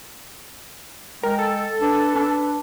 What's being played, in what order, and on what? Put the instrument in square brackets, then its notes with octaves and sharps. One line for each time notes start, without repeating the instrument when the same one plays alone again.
[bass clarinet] G#3 [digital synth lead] A#4 [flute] G5
[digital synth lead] A4
[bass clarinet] D4 [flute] B4
[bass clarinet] D4